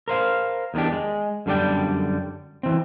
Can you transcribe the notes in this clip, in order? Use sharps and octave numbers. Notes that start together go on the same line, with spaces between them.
A#4 C5 F5
E2 D#3 A#3 D4 G4
G#3
F#2 D3 G3 D5 G5
E3 C4